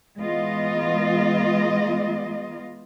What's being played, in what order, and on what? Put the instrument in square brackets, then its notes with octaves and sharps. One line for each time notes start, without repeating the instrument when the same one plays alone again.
[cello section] E3 G#3 B3 F4 D#5